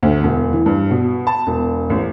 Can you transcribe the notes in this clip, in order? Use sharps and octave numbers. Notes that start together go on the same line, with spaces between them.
D2
E1
E3
G2
B2
A5
E1
A1